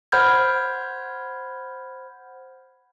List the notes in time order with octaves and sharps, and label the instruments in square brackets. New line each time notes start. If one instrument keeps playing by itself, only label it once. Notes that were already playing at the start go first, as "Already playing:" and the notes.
[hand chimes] C5 F#5 B5 F6 G6 G#6